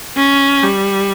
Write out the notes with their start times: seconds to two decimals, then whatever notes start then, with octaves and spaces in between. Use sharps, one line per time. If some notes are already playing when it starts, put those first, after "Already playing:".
0.16 C#4
0.63 G3